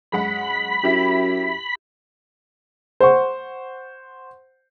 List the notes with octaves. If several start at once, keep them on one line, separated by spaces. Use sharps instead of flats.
F#2 G#3 F#5 B5
F#2 E4 G4
C5 F#5 C#6